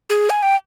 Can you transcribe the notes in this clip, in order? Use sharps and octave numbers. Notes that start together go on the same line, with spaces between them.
G#4
G#5
G5